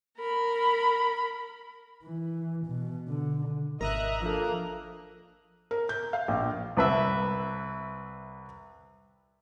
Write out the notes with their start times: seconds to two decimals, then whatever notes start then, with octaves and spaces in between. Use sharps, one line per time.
0.18 A#4 B5
2.04 E3
2.66 B2
3.08 D3
3.81 G#1 A#4 D#5 E5 A#5 D#6 F#6
4.22 F3 A#3 D4 A4
5.71 A#4
5.89 G6
6.13 F5
6.28 A#1
6.77 C2 B4 E5